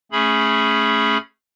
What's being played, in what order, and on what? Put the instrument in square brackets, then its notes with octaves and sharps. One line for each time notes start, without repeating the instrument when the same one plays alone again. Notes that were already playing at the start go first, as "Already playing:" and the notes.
[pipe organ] A3 C#4 G#4 B5